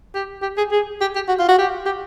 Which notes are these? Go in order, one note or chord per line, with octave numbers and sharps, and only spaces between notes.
G4
G4
G#4
G#4
G4
G4
F#4
F4
F#4
G4
G4